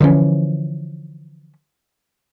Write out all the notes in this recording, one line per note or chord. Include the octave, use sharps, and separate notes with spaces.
D3 E3 F3 C#4